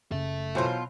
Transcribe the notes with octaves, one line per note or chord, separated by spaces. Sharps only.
F#1 C#3 A4 E5
B2 E3 F#3 F4 C5